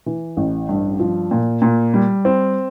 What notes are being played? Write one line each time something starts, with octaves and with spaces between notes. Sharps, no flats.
E3
A1
G2
F3
A#2
A#2
G3
C4